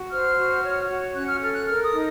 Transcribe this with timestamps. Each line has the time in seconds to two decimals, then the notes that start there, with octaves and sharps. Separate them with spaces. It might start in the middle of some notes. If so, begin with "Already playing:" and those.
Already playing: F#4
0.10 C5 F6
0.37 F#4
0.63 C#5
0.89 F#4
1.15 C#4 F#6
1.27 F6
1.41 A4 F6
1.53 F#6
1.66 A#4 F6
1.85 D#6
1.92 D#4